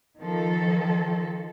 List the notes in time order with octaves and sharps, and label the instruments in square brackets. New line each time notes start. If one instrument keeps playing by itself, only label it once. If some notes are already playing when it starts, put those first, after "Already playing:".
[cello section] D#3 F3 A4